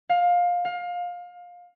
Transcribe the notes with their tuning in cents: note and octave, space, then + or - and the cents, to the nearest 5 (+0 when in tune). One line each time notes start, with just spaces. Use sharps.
F5 +20
F5 +25